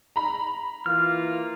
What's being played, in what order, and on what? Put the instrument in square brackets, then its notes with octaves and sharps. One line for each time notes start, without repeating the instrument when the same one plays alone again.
[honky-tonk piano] A#5 B5
[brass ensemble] E3 A#3 F4 [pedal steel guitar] F6